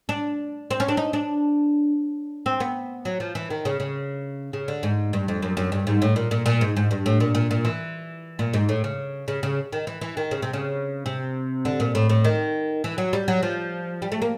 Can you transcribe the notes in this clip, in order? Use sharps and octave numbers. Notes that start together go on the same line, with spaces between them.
D4
C4
C#4
D4
D#4
D4
C4
B3
F#3
F3
E3
D#3
C#3
C#3
C#3
D3
G#2
G2
F2
F#2
F#2
G2
G#2
A2
A#2
A#2
A#2
G#2
G#2
G2
A2
A#2
A#2
A#2
E3
A#2
G#2
A2
C#3
C#3
C#3
D#3
E3
E3
D#3
C#3
C3
C#3
C3
D3
A#2
A2
A2
D#3
E3
F#3
G3
F#3
F3
G3
A3
A#3